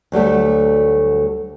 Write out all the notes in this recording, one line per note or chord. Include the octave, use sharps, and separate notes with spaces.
D2 F#3 G3 A3